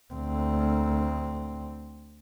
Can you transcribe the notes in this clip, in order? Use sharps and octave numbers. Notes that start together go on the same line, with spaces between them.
D2 C4